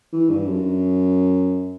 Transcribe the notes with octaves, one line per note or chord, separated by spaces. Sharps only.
E3
G2
F#2